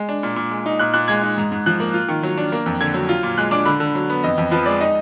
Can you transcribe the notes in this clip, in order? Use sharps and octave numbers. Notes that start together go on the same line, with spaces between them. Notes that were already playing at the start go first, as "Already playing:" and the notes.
Already playing: G#3
D4
A#2
A#2
G#3
D#4
A#2 F#6
A#2 F#6
G#3 G#6
D#4
G#2
G#2
F3 F#6
A#3
F4
D#3
F#3
D4
A#3
F2
D3 G#6
F#3
F4
A#2
G#3 F#6
D4 D6
D3 B5
D3
F#3
B3
F2 D#5
F2
F3 B4
G#3 D5
D#4 D#5